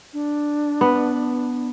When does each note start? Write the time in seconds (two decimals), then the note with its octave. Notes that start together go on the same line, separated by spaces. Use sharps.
0.13 D4
0.81 B3